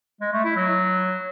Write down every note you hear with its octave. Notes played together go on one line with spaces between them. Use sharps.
G#3
A3
E4
F#3